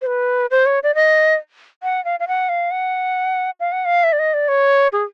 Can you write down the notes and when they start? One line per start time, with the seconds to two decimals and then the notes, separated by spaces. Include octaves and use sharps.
0.02 C5
0.07 B4
0.51 C5
0.66 C#5
0.83 D5
0.95 D#5
1.83 F#5
2.05 F5
2.20 F5
2.28 F#5
2.49 F5
2.71 F#5
3.60 F5
3.72 F#5
3.85 F5
4.04 E5
4.13 D5
4.19 D#5
4.34 D5
4.48 C#5
4.93 G#4